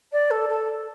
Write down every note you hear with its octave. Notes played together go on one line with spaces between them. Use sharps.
D5
A4
A4